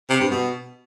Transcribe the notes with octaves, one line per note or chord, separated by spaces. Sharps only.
C3
G2
B2